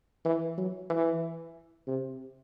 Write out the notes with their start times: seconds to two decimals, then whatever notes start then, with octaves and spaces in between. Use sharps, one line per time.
0.25 E3
0.58 F#3
0.90 E3
1.87 C3